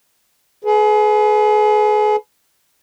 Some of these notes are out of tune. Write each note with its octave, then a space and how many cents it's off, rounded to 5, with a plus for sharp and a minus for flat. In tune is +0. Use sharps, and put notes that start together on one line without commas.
G#4 +35 B4 +0